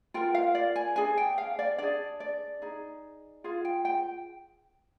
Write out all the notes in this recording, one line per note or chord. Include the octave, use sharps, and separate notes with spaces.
F4 A#4 G5
F5
D5
G#5
D4 G#4 G#5
G5
F5
D5
D4 G#4 D5
D5
D#4 G#4
F4 G#4 F5
G5
G5